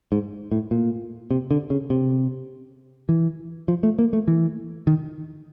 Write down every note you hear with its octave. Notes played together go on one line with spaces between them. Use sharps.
G#2
A2
A#2
C3
D3
C#3
C3
E3
F3
A3
A#3
A3
E3
D#3